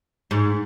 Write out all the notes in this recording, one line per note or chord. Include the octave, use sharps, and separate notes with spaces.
G#2